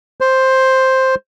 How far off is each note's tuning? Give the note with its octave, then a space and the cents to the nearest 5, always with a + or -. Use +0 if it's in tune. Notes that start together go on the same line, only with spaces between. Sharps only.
C5 +5